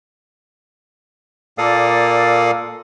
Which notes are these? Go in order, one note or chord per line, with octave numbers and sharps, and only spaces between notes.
A#2 A#3 A4 D5 F5 D#6